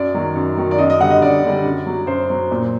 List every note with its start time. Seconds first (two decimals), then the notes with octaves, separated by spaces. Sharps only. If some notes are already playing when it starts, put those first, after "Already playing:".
Already playing: F#2 D5
0.14 D#3 F#3
0.36 F#2
0.57 D#3 F#3
0.71 D5
0.78 F#2 D#5
0.90 D#5
1.00 D3 G3 F#5
1.10 D#5
1.22 F#2 D5
1.43 D3 G3
1.65 F#2
1.86 F#3
2.07 F#2 C5
2.29 F#3
2.51 A#2